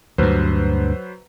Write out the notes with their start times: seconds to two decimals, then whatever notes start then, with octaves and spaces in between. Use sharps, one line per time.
0.18 D2 G2 F#3 B4 C5